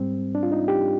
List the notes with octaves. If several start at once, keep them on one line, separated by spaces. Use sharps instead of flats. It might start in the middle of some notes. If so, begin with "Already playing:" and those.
Already playing: G#2 G3 C4
D4
F4
D#4
G4